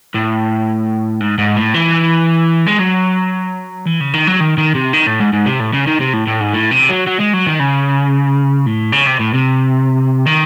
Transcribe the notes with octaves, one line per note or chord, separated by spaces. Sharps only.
A2
G#2
G#2
A2
E3
G#3
F#3
E3
C#3
D#3
F#3
D#3
D#3
C3
D#3
A2
G#2
G#2
C3
A2
C#3
D#3
C3
A2
A2
G#2
A2
C3
F#3
F#3
G#3
F#3
D#3
C#3
A2
C#3
C3
A2
C3
D#3